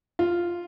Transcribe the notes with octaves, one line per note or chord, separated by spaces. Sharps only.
F4